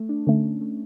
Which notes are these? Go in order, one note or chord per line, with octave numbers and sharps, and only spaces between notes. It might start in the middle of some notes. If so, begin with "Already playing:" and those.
Already playing: A3
D4
D3 A3 C#4
A3